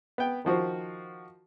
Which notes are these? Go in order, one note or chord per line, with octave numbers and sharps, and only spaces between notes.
B3 G5
D#3 F3 F#4 C5